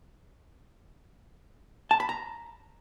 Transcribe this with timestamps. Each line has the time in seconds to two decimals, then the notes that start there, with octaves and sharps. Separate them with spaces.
1.91 A5
2.00 B5
2.09 A#5